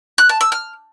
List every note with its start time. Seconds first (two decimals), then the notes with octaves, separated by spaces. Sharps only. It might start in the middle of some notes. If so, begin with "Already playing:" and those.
0.18 F#6
0.29 A5
0.41 E6
0.52 F6